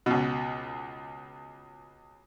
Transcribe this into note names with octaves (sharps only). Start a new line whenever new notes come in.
C#2 B2